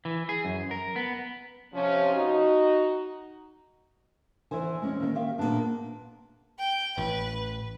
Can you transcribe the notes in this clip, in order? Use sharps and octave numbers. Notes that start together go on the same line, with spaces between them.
E3
G#4
F#2
A#4
B3
C3 F3 C#4
D#4 F#4
E2 E3 E4 C5 G#5
G#3 C#4
D#3 A#3
G4 E5 F5
A#2 A#3 B3 D4 G#4
G5
A1 B4